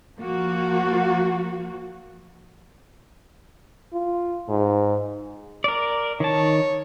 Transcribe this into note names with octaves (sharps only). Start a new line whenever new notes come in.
F3 A#3 F#4
F4
G#2
A#4 D5
D#3 C#5 A5